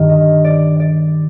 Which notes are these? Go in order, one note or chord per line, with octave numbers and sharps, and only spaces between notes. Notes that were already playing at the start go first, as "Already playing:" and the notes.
Already playing: G2 D#3
D#5
D5
D5